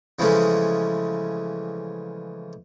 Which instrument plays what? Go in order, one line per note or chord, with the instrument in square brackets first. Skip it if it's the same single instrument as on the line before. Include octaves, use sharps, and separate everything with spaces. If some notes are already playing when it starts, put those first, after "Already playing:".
[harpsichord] C#3 E3 F3 G#3 A3 C#4